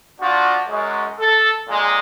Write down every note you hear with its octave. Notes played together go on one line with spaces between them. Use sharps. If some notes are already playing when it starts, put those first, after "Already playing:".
F3 D4 F4 F#4
F#2 G#3
A4
F2 A#2 G#3